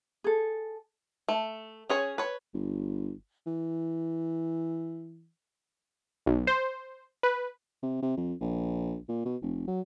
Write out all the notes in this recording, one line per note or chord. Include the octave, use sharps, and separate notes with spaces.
G#4 A4
A3
C#4 G#4 C#5
B4 C#5
G1
E3
B1
C5
B4
C3
C3
F2
A#1
A#2
B2
F1
F#3